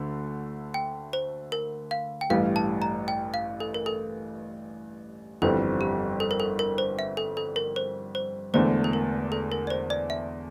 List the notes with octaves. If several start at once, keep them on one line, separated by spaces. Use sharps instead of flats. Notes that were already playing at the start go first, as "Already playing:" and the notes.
Already playing: D2 D3 A3
G5
C5
A#4
F5
G5
A1 G2 E3 G3 F5
A5
A#5
G5
F5
A4
A#4
A4
G1 F2 E3 G3 C4 A4
G4
A4
A#4
A4
A#4
C5
E5
A4
A4
A#4
C5
C5
E1 E2 D3 A3 D4 C5
A4
A#4
A4
A#4
D5
C5
D5
E5